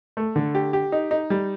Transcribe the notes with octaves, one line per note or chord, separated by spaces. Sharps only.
A3
D3
G4
G4
D#4
D#4
G3